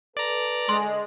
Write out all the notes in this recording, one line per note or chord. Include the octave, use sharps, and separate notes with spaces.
A4 B4 D5 A#5
D3 G#3 C6